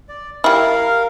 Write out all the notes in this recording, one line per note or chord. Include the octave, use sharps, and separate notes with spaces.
D5
G3 E4 A#4 F5